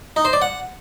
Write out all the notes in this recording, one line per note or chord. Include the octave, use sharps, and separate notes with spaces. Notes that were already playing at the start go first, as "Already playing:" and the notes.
D#4
C5
D5
F#5